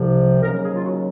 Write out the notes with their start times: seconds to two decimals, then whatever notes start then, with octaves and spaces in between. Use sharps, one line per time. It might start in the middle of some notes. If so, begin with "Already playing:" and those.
Already playing: C2 C3 F3
0.42 D#2 C#3 F#3 A#4
0.63 G#4
0.74 F4
0.83 F#4